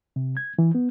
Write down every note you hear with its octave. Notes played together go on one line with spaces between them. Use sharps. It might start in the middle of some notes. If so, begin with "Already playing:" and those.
C3
G#6
E3
B3